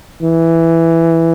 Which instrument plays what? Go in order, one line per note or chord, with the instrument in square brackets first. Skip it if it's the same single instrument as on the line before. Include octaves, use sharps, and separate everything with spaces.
[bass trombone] E3